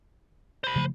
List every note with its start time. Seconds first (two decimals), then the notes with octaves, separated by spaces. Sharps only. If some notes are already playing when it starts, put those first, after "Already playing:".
0.64 C5 B5
0.76 C#3 F3 A3